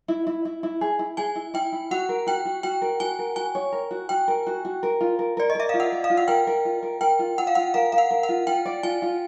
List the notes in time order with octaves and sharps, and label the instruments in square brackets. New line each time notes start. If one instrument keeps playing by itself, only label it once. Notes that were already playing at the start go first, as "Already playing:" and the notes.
[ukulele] E4
E4
E4
E4
G#4
E4
[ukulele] G#4 [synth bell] G#5
[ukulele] E4
[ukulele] E4 [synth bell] G5
[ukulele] E4
[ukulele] F#4 [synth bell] F#5
[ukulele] A#4
[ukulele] F#4 [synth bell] G5
[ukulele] F#4
[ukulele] F#4 [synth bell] G5
[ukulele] A#4
[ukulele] F#4 [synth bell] G#5
[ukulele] A#4
[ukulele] F#4 [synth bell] G#5
[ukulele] C#5
A#4
F#4
[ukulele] F#4 [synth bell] G5
[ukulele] A#4
F#4
F#4
A#4
F4
A#4
[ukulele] A#4 [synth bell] D5
[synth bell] D#5
[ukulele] A#4 [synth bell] E5
[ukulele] F4 [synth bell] F5
[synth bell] F#5
[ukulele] D5
[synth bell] F5
[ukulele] F4
[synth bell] F#5
[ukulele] A#4 [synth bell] G5
[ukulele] A#4
F4
A#4
[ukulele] A#4 [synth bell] G5
[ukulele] F4
[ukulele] F4 [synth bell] F#5
[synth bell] F5
[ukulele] F4 [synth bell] F#5
[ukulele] A#4 [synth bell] F5
[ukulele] A#4 [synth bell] F5
[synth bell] F#5
[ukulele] A#4
[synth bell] F#5
[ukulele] F4
[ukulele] F4 [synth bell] G5
[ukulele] D5
[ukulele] F4 [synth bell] G#5
[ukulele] F4